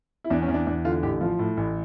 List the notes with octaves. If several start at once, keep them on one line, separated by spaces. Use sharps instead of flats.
E4
E2 D4
C#4
E2
D4
E2 D4
D3 F4
A1 G4
F3 F4
A2
A1